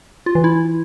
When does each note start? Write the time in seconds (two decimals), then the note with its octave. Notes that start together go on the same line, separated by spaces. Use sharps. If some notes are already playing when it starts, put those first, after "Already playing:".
0.26 F4
0.35 E3
0.44 E4